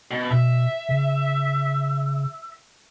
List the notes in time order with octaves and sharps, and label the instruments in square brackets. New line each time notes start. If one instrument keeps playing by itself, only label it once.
[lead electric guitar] B2
[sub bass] B2 [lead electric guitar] E5
[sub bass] C#3